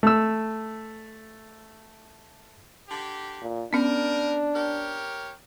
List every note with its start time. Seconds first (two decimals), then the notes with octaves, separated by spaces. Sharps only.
0.03 A3 E6
2.89 D3 G4
3.42 A#2
3.73 G3 B3 C#4 D4 A#4
4.55 G4 A#4 C#5